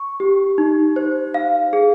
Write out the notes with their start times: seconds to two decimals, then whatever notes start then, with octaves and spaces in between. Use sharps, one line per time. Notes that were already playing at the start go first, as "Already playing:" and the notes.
Already playing: C#6
0.20 G4
0.58 D#4
0.96 C5
1.34 F5
1.73 G#4